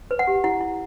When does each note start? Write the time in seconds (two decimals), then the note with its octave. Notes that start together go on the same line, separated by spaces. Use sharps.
0.11 B4
0.19 F#5
0.27 G4
0.44 E4 F#5
0.61 E4